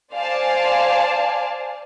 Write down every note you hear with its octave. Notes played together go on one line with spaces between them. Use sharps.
C5 D5 F5 G#5 A5